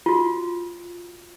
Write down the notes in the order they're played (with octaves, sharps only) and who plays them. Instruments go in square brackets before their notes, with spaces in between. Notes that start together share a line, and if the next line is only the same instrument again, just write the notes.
[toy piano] F4 F#4